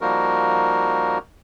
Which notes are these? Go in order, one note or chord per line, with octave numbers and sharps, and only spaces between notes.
F3 G3 A#3 D#4 F#4 A#4